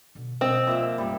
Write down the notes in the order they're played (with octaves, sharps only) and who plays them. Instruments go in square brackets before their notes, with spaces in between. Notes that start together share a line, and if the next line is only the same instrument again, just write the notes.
[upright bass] B2 D3
[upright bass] B2 D3 [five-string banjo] C4 [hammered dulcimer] D#5
[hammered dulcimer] A#2 E5 [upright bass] F3 F4
[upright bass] F#1 A2 [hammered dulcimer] G3